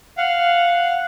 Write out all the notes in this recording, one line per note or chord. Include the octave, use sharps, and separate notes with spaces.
F5 F#5